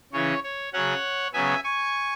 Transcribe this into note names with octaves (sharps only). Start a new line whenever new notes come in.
C#3 E3 C#4 C#5
C#5
C#3 F#3 C#4 C#5 F#5
C#3 F#3 B3 E5 G#5
G#5 C#6